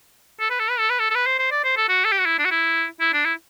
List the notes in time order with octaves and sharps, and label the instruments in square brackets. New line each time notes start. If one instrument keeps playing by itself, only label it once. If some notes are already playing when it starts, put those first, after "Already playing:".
[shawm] A4
B4
A4
B4
A4
B4
A4
A4
B4
C5
C5
D5
C5
A4
F#4
A4
G4
F#4
E4
D4
F#4
E4
E4
D4
E4